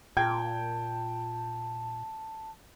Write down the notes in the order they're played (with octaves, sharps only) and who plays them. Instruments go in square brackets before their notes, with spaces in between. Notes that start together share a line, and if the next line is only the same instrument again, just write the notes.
[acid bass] A#2 [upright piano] G5 G#6 [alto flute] A5